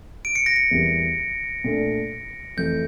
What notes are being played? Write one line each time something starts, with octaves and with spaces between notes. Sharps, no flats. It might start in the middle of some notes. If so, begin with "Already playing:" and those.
D7
C#7
A#6
C#7
E2 E3 G3 A#3
A#2 A3 D4
F2 E3 A3 G6